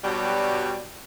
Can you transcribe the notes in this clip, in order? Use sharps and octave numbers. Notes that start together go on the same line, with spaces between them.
G2 B2 F#3 G3